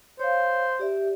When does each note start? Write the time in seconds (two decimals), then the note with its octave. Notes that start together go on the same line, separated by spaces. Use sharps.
0.19 C5 C#5 F5
0.79 G4 D5 E5